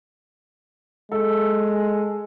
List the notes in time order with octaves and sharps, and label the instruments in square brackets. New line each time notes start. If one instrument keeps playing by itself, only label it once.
[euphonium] G#3 [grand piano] A4